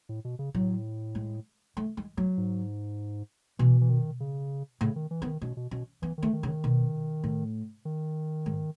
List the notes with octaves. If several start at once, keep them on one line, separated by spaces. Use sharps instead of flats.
A2
B2
C#3
A2 F#3
G#3
A3
G#3
F#3
G#2
B2 E3
E3
D#3
C#3
A2 C#3
D#3
E3
B3
D#3
B2 C#4
B2
B2 C#4
E3 B3
D#3 A3
D#3
C#3
D#3
B2
A2
D#3
G#2